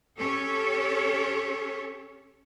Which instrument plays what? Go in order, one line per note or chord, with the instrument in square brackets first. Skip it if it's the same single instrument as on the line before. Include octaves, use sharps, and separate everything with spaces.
[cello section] C#4 G4 A4 C#5